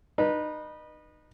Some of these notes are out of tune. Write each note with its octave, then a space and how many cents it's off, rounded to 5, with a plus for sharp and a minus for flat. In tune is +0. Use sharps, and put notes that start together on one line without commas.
D#4 -30 B4 -25